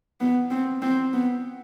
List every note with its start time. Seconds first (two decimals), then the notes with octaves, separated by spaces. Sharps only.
0.21 B3
0.50 C4
0.82 C4
1.13 B3